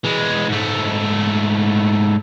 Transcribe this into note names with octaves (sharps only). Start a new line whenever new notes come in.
E3 G#3
G#2 A3